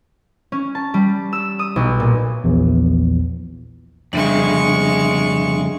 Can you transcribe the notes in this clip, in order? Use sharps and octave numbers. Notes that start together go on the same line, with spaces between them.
C#4
A5
G3
E6
D#6
B1
A#2
A#1 E2
F2 C#3 G3 G#3 D4 E5 C#6